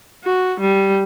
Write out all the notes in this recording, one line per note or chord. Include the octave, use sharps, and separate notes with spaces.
F#4
G3